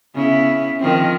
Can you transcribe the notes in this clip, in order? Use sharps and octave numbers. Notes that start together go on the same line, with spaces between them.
C#3 B3 E4
D#3 F3 C4